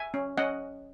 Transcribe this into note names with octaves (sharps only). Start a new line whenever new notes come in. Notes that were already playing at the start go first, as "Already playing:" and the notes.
Already playing: E5 G#5
C#4
C#4 D#5 F#5